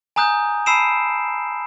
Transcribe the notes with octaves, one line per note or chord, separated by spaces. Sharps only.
G#5 A#5 D#6 F#6 G6
A5 B5 E6 C7 D7 E7